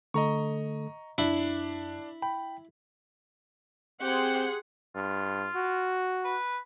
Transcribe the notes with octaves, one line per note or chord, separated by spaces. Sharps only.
D3 A3 A4 D#5 A#5 C#6
F#2 D4 E4
G5 B5
C4 G4 G#4 C5 F#5 C6
G2 F4
F#4
B4